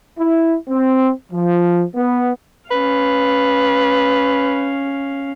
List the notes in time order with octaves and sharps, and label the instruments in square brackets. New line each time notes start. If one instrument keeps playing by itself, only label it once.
[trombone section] E4
C4
F3
B3
[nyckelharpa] C#4 F5 [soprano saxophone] B4